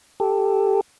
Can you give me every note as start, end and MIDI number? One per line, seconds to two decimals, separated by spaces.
0.20 0.81 67
0.20 0.81 69